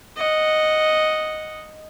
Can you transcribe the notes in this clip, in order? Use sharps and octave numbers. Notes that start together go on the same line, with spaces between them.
D#5 F#5